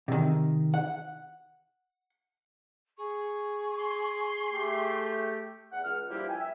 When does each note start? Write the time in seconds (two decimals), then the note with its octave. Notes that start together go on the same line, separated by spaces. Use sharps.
0.08 C3 D#3
0.74 F#5
2.98 G#4 C#6
3.77 C6
4.54 A3 G4
5.72 E2 F#5
5.84 C#2 F6
6.09 G2 F3 G3 A#3 E4
6.28 G5 G#5
6.40 E5